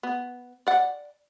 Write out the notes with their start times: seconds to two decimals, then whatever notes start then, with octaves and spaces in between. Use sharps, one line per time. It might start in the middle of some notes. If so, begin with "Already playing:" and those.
0.03 B3
0.67 D5 F#5